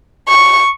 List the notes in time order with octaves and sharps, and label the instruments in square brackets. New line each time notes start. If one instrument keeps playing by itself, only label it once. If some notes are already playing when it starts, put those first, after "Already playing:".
[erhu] C#6